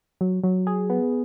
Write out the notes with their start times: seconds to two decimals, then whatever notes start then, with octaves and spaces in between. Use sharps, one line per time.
0.21 F#3
0.44 F#3
0.67 G#4
0.90 B3